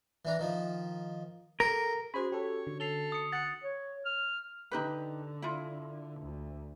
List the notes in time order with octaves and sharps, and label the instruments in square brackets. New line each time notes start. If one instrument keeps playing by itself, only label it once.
[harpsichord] E3 D4 A#5
D#3 F3
[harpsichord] G4 A4 A#5 [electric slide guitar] A#4
[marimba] C#4 F#4 [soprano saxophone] G#4 [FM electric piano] C5 B5
[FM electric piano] G4 A4 [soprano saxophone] C#5
[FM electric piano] D3
[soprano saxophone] A4 [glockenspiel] C7 F7 G7
[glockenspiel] D#6 C#7
[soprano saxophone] F#5 [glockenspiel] A6 C#7
[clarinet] C#5
F6
[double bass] D3 [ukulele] D#4 G4 B4
[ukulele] E4 F4
[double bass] D2